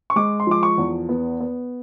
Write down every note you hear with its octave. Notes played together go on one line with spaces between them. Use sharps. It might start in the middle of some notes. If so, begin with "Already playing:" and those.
C#6
G#3 D6
C6
F3 D6
C#6
E2
B3
B3